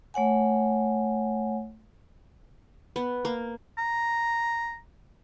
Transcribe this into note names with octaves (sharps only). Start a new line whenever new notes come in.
A3 C#5 F#5 G#5
B3
A#3
A#5